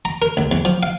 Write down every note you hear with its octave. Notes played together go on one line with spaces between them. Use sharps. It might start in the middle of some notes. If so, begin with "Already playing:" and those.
A#5
A#4
C#2
E2
F3
F5